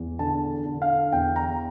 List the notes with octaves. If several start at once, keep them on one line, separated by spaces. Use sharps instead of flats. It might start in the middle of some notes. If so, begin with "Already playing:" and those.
Already playing: E2
D3 A5
D3
F5
E2 G5
A#5